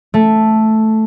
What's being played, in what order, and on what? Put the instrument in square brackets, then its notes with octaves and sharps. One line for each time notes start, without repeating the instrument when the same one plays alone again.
[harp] A3